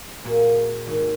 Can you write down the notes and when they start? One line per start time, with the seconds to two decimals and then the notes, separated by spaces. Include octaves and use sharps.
0.24 A#2 A#3 F#4 G#4
0.86 G#1 D#4